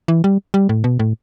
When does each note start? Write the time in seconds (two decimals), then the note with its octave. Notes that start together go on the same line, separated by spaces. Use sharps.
0.08 E3
0.24 G3
0.54 G3
0.69 A2
0.84 B2
0.99 A2